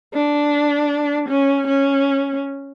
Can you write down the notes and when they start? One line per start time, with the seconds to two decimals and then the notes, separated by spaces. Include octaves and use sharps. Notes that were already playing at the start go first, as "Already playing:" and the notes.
0.14 D4
1.29 C#4
1.67 C#4